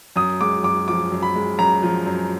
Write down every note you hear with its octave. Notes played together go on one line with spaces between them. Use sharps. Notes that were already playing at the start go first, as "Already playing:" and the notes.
F#2 D#6
G#3 D6
F#2 D6
F3 D6
F#2
B5
G#3
F#2 A#5
F3
F#2